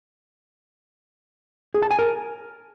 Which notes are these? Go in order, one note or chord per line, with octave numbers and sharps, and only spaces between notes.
G#4
A5
G#5
A#4